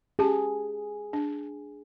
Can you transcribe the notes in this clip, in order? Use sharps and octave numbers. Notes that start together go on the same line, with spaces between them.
C#4 G4 G#4 A5
D4